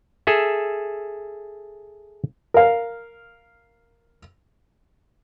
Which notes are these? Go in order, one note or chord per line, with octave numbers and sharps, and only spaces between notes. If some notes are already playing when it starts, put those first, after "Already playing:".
G#4 A4 E5
A#4 F5